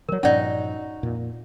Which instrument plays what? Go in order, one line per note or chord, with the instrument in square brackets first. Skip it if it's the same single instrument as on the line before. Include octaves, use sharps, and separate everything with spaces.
[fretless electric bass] D#3 F#3 [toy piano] A#4 C#5
[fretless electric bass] G2 A#2 F3 [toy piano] C#4 D5 [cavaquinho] D#4 F#4
[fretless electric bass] F2 A#2